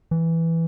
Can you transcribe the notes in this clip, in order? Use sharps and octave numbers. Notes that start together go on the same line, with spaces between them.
E3